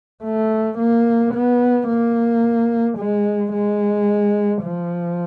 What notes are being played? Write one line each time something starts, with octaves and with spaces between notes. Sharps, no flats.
A3
A#3
B3
A#3
G#3
G#3
F3